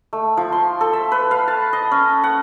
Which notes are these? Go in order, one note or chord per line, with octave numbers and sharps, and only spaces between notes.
A3
F3
C6
A4
E5
B4
F5
A5
D#5
C#4
F#5